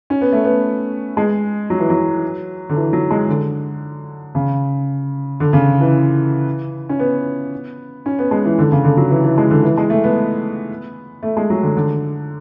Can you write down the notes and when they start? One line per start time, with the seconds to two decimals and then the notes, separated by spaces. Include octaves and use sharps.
0.10 C#4
0.21 B3
0.32 A3
0.44 B3
1.17 G#3
1.70 F#3
1.79 E3
1.90 F#3
2.69 D3
2.76 E3
2.93 F#3
3.11 G#3
3.29 D3
4.35 C#3
5.40 D3
5.53 C#3
5.80 E3
6.89 C#4
6.99 B3
8.06 C#4
8.19 B3
8.31 G#3
8.45 E3
8.59 D3
8.72 C#3
8.84 D3
8.97 F#3
9.10 E3
9.25 E3
9.38 G#3
9.50 D3
9.63 E3
9.77 G#3
9.90 A3
10.04 B3
11.23 A3
11.37 G#3
11.50 F#3
11.63 D3
11.76 D3